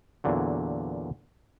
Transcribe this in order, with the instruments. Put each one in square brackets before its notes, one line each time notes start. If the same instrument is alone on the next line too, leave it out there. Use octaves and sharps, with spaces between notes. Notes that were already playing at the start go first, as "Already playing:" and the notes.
[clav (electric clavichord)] E2 A#2 D3 F#3